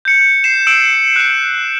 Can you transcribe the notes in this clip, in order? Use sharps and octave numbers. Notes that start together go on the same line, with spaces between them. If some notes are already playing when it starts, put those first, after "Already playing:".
G6 C#7
C7 E7
E6 D7 E7
F#6 E7